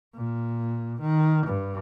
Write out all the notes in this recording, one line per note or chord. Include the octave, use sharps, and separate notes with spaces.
A#2
D#3
G2